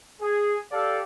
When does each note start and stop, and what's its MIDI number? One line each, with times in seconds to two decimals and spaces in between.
0.21 0.56 68
0.72 1.00 67
0.72 1.00 69
0.72 1.00 74
0.72 1.00 77